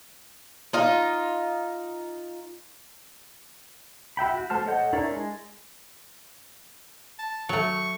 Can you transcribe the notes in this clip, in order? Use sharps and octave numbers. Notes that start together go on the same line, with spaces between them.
D#4 F4
F#4 E5 G5 B5
F#4
A3 C5 A5 F6
A4 C#5 D#5 F#5 G6
D4 E4 A#4 C#5 D5
G#3
A5
F#3 A3 C#6